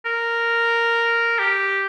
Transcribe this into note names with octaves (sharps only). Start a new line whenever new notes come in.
A#4
G4